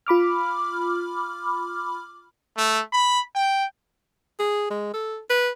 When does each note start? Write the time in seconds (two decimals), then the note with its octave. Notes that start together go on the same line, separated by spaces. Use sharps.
0.07 F4 B5 D6 F6
2.57 A3
2.93 B5
3.35 G5
4.39 G#4
4.70 G#3
4.94 A4
5.30 B4